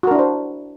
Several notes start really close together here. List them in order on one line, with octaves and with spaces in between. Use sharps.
F#4 A#4 D4 E4 C5